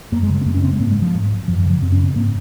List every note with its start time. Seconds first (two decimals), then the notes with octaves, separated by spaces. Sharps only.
0.12 F#2 A#3
0.23 G#3
0.29 C#3
0.34 G#3
0.41 C4
0.46 F#2 A#3
0.54 C#4
0.63 C#3 C4
0.72 G#3
0.79 G#2 A#3
0.91 G#3
1.02 F3
1.14 G#2
1.48 F#2 F3
1.60 F3
1.65 C#3
1.70 F3
1.82 F#2 C4
1.92 C#4
1.98 C#3
2.05 C4
2.15 G#2 A#3